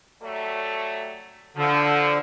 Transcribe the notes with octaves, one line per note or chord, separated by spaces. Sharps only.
F#3 G3 A3
D3 F3